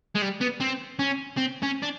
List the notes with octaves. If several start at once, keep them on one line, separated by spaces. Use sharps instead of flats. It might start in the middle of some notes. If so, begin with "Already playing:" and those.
G#3
G3
B3
C4
C#4
C4
C#4
D4